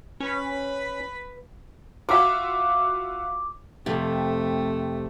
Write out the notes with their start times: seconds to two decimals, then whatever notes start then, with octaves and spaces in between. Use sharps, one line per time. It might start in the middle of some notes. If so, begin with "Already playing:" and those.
0.20 C#4 B4 B5
2.09 F4 F#4 E5 D6
3.86 F2 C3 A3